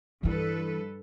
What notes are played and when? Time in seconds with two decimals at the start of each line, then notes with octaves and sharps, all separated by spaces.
0.23 G2 E3 E4 A4 B4